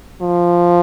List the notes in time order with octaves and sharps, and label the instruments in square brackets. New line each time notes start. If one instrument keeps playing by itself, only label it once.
[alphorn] F3